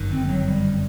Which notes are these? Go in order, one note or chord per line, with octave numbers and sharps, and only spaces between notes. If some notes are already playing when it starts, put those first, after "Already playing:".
Already playing: G1 F#2 D#3
C4
F#3
G3